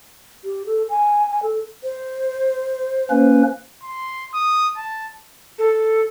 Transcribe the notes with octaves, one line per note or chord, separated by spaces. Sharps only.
G4
A4
G#5
G#5
A4
C5
A#3 C#4 B4
C6
D#6
A5
A4